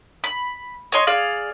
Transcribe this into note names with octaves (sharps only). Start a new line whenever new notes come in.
B5
C#5 D#5 C6
G#4 D5 F5